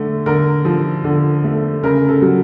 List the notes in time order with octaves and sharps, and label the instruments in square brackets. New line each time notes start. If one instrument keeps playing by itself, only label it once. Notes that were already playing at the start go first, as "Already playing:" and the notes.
Already playing: [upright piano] D3 A3
D3 A#4
F3
D3
A3
C#3 A#4
A4
F#3